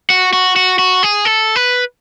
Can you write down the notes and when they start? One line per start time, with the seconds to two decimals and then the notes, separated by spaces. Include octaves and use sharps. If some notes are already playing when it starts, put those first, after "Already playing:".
0.10 F#4
0.33 F#4
0.56 F#4
0.79 F#4
1.03 G#4
1.25 A4
1.56 B4